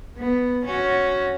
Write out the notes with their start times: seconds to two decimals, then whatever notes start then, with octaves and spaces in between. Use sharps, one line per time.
0.18 B3
0.65 C#4 F#4